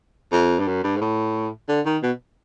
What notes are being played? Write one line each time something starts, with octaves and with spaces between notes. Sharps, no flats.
F2
G2
F#2
G2
G#2
A2
D3
D#3
B2